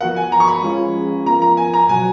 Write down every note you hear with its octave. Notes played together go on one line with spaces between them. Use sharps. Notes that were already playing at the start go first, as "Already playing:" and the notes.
F3 B3 F#4 A#4 F#5
G#5
A#5
C#6
B5
F3 G#3 C#4 F4 G#4
F3 B3 F4 A#4 A#5
A#5
G#5
A#5
B2 F#3 B3 F#4 G#5